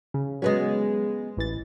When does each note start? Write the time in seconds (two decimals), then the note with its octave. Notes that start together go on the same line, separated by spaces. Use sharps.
0.14 C#3
0.42 F#3 G#3 B3 C#4
1.37 A1 E3 A6